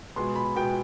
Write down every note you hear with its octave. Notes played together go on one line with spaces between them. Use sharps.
B2 G#3 B3 C6
B5
B2 G#3 B3 G5